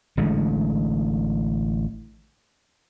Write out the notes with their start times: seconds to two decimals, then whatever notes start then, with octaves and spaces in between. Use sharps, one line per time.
0.17 A1 D3 G#3 A3